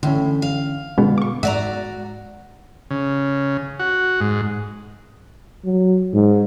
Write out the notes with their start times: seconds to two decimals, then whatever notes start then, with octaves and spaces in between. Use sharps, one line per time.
0.03 A2 D3 E3 C#4
0.42 F5
0.98 B2 D3 G#3 B3
1.18 C#6 D6
1.43 G#2 F#4 D5 E5 A#5
2.90 C#3
3.79 F#4
4.20 G#2
5.65 F#3
6.13 G#2